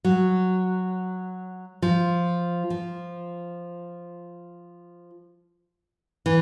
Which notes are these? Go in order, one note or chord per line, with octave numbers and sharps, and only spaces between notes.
F#3
F3
F3
E3